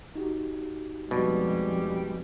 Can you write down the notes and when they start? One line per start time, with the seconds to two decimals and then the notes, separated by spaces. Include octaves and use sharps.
0.15 D#4 F#4 G4
1.11 F2 B2 G3 G#3